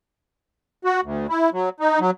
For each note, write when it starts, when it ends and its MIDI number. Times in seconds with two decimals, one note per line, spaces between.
0.84 1.01 66
1.04 1.27 38
1.29 1.50 64
1.53 1.69 54
1.80 1.99 63
2.00 2.11 54